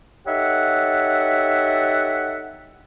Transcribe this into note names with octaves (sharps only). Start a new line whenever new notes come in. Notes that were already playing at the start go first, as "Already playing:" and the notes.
D#4 G4 A4 C#5 E5 F#5